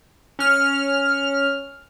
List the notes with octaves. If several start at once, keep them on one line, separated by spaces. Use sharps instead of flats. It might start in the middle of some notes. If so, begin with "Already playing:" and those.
C#4 F6